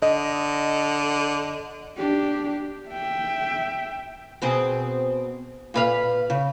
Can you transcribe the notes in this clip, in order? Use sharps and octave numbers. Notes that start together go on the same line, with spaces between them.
D3 D#5
D4 G4
E5 G5
B2 C4 G#4
A#2 B4 F5
C#3